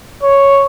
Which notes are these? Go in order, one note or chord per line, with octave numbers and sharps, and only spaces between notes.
C#5